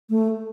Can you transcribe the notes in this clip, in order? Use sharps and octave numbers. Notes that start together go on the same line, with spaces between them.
A3